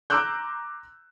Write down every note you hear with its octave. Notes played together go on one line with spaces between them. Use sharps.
A#5 C6 D6 E6 F#6 G6